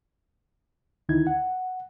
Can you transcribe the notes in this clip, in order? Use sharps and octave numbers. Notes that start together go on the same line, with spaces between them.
D2 D3 D#3 D#4 E4 G#6
F#5